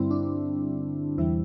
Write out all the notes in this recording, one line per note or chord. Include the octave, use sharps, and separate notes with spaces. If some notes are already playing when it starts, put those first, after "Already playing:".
Already playing: G2 D3 G3 C4 E4
D4
E2 C3 E3 G3 E4